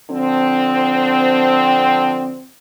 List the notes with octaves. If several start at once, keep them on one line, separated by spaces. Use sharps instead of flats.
D3 F3 C4